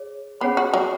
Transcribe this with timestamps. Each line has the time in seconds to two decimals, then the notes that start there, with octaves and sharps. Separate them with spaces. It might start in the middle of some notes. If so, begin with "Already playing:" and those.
Already playing: G#4 C#5
0.41 B3 C#4 G#4 C#5 F#5 B5
0.57 F#4
0.74 F#3